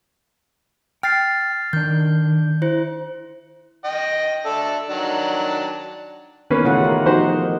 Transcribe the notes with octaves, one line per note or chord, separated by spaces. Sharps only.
G5 F6 A6 C7
D#3 D4 G6
E4 C5
D#5 G5
D4 A4 E5
D#3 F#3 D4
D#3 E3 A#3 B3 C#4 B4
C#3 A3 F4 F#5
G4 A#4
F3 D#4 F#4 C5